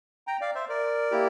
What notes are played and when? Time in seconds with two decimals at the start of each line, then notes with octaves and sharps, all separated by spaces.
0.27 G5 A#5
0.41 D5 F5
0.55 C5 E5
0.69 A#4 D5
1.11 A#3 E4 G4